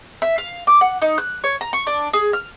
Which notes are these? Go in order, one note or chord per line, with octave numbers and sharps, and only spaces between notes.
E5
F5
D6
F#5
D#4
F#6
C#5
A#5
C#6
D4
G#4
F6